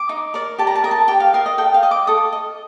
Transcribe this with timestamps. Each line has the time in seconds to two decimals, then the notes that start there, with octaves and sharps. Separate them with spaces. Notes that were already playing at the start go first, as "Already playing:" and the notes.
Already playing: D6
0.09 D#4
0.34 A#4 D5
0.59 G4 A5
0.67 A#5
0.75 A5
0.84 A#4 D#5 A#5
0.91 A5
1.08 G4 G5
1.20 F5
1.33 A#4 D#5 F5
1.46 D#5
1.58 A4 G5
1.74 F5
1.83 D#5
1.91 D6
2.07 A4 D#6
2.33 D#5